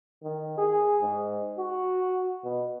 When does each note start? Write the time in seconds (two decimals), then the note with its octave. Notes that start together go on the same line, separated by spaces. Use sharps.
0.23 D#3
0.58 G#4
1.02 G#2
1.58 F#4
2.44 B2